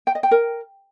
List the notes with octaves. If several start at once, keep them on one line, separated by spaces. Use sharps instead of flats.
G5
D#5
G5
A#4